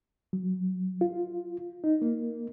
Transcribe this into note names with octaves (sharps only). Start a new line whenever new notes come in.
F#3
F4
D#4
A#3